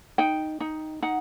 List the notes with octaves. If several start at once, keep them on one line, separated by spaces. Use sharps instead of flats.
D#4 G5
D#4
D#4 F#5